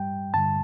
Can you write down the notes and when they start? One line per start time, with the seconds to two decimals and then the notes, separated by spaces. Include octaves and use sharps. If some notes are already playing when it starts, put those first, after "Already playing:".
Already playing: G2 G3 G5
0.34 G2 D3 G3 A5